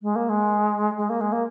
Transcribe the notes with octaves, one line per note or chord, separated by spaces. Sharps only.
G#3
A#3
G#3
G#3
A#3
G#3
A#3